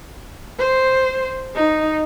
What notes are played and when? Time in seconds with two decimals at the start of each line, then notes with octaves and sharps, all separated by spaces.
0.59 C5
1.55 D#4